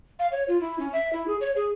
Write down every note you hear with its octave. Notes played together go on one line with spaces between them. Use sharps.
F5
C#5
F4
E4
C#4
E5
E4
G#4
C#5
G#4